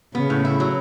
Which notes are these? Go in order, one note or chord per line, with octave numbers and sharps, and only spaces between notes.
C#3 B3
A2
E4
F#3